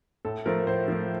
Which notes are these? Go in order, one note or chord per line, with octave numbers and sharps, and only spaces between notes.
A2 A4
F3 A3 A#4
A2 C5
F3 A3